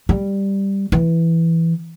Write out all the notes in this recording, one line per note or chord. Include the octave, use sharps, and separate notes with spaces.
G3
E3